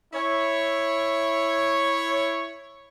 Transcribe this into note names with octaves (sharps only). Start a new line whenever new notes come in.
E4 C#5